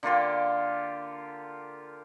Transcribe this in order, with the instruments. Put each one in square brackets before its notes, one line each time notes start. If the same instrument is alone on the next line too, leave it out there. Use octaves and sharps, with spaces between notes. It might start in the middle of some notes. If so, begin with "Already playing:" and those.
[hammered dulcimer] D3 A#3 F4 G4